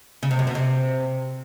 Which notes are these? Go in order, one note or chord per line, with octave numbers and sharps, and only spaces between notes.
C#3
C3
F#2
B2
C3